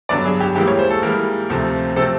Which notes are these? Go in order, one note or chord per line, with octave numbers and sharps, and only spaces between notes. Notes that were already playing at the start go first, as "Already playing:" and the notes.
G2 D3 F#3 B3 D5
G#4
G4
G#2 E3 G3 A#3 G4
C#5
C5
A4
G#2 E3 G3 A#3 A#4
D2 C3 F3 A3 C4
C3 F3 A3 C4 A4